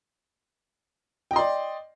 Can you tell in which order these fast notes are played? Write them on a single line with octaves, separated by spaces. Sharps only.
G5 D#5 C6 D5